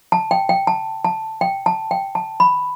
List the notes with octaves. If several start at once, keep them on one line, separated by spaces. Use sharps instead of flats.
A5
G5
G5
A5
A5
G5
A5
G5
A5
B5